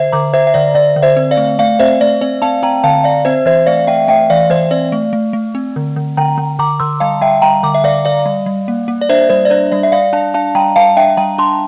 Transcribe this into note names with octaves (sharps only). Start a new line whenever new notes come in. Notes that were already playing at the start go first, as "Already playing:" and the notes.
Already playing: D3 C5 E5
D3 A#5 D6
D3 C5 E5
E5
D3 D5
D3 D5
D3
C5 E5
C4
D5 F5
A3
A3 D5 F5
C4 C5 E5
A3 D5
C4 D5
C4 F5 A5
C4 G5 A#5
D3 F5 A5
D3 D5 F5
C4 C5 E5
E3 C5 E5
A3 D5 F5
A3 E5 G5
A3 E5 G5
E3 D5 F5
E3 C5 E5
C4 D5
A3
A3
A3
C4
D3
D3
D3 G5 A#5
D3
D3 A#5 D6
D3 C6 E6
G3 F5 A5
G3 E5 G5
G3 G5 A#5
D3 A#5 D6
E5
D3 D5 F5
D3 D5 F5
G3
G3
A#3
A#3
D5
D4 C5 E5
G3 C5
D5
D4 C5
G3 D5
E5
G3 D5 F5
D4 F5 A5
D4 F5 A5
G3 G5 A#5
G3 F5 A5
D4 E5 G5
G3 G5 A#5
D4 A5 C6